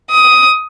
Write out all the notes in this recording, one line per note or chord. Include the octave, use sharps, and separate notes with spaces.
D#6